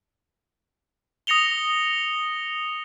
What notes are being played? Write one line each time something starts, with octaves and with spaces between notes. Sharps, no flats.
D#6 A#6 C#7 F7 G7